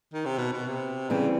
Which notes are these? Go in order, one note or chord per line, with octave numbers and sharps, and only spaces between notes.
D#3
C3
B2
B2
C3
C#3 E3 G3 C4